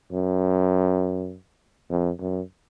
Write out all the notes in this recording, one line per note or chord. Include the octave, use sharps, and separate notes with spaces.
F#2
F2
F#2